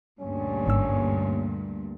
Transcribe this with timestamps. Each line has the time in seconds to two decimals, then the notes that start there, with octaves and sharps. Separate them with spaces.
0.20 D2 G2 A#2 C#4
0.66 G#1 G#2 E6